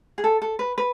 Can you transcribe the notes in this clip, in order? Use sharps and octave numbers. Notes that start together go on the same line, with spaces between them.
G#4
A4
A4
B4
B4